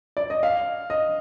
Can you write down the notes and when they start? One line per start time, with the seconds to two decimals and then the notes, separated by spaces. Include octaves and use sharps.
0.17 D5
0.30 D#5
0.43 F5
0.90 D#5